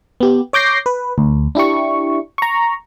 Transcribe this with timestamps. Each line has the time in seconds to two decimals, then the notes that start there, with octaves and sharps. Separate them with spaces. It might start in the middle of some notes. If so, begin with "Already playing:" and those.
0.20 B3 G4
0.53 C#5 D6 G6 A#6 C7
0.86 B4
1.18 D2
1.55 D4 E4 G4 C#6
2.38 A#5 C#6